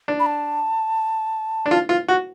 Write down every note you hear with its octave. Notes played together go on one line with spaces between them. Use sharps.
D4
B5
A5
D4
F4
F4
F#4